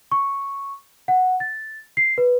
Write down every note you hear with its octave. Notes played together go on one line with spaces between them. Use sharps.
C#6
F#5
A6
C7
B4